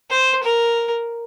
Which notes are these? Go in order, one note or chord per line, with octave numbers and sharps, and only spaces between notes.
C5
A#4